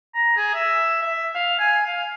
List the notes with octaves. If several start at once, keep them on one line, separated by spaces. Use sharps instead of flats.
A#5
G#4
E5
E5
F5
G#5
F5